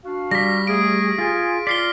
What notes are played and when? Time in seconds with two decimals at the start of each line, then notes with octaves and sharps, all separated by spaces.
0.05 D4 F#4 F5
0.31 G3 A#6 B6
0.67 A3 G#4 D7
1.18 F4 G#4 G#5
1.67 F4 D5 B6 C7 G7